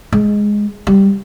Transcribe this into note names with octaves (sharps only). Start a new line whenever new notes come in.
G#3
G3